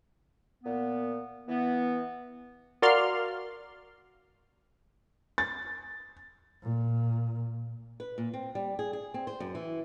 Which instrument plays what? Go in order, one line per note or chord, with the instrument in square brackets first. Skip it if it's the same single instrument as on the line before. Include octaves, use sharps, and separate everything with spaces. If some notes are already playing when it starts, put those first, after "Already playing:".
[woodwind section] A#2 B3
E3 B3
[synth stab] F#4 A#4 D5 F5 C6 F6
[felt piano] A6
[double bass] A#2
[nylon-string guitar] B4
A#2
C4
G3
G#4
G#4
C4
C5
F#2
E3